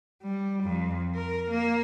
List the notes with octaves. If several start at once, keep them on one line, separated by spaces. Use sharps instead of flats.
G3
F2
A#4
A#3